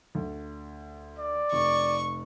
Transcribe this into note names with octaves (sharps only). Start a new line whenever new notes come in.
D2
D5
F1 C#6